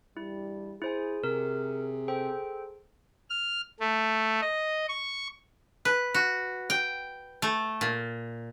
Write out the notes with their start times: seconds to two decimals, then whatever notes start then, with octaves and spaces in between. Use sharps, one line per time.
0.17 E2 G2 G3 E4
0.82 E4 G#4 C5 G#5
1.24 C3 A#4
2.08 A4 C5 G5
3.30 F6
3.80 A3
4.41 D#5
4.88 C#6
5.85 B4
6.14 F#4
6.70 G5
7.42 A3
7.81 A#2